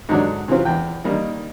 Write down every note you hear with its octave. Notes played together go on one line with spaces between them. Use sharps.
G#2 D3 F#3 D4
C3 E3 F#3 C4 F4
E2 G5
D#3 G3 A#3 D#4